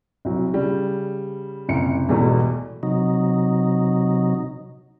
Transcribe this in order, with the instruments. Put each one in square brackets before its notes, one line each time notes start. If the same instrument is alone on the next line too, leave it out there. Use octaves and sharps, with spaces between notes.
[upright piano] C2 F#3
C#3 G3
F#1 C2 C#7
B1 E2 G#2 B2 G3 A3
[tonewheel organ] C3 F#3 D#4